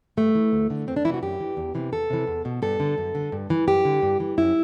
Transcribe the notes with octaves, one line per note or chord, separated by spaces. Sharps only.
G2 A3
E3
D2
D3
E2 C4
D4
C3 E3 E4 F#4
F#2 G4
E3
E2
C3 E3
E2 A4
C3 E3
E2
B2
G2 A4
D3
F#2
D3
G2
E3
F#2 G4
D3
G2
E3
F#2 E4